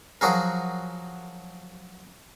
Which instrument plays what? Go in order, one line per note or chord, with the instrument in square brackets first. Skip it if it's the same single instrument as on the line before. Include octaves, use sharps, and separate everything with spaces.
[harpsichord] F3 F#3 F#4 G#4 A#4